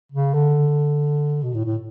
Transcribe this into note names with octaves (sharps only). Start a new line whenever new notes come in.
C#3
D3
B2
A2
A2